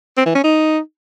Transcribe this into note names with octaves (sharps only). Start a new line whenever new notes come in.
C4
E3
C#4
D#4